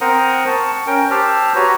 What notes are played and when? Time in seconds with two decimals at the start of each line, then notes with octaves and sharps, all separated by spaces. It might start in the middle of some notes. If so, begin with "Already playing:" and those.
0.01 C4 A#4 C5 F#5 A#5 D#6
0.47 A5 C#6
0.87 C#4 A#4 G5
1.11 G4 C5 A5 E6 F6
1.55 F#4 B4 C#5 A#5